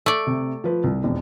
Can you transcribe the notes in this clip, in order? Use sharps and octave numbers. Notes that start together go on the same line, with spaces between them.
A3 D5
C3
F3 B4
C2
E1 F2